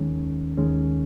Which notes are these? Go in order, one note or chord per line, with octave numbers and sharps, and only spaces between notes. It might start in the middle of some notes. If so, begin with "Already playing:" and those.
Already playing: D#2 D#3 G#3 C#4
D#2 D#3 G#3 C#4